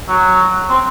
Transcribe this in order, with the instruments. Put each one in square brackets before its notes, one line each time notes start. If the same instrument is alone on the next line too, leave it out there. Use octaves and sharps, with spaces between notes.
[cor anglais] F#3
C4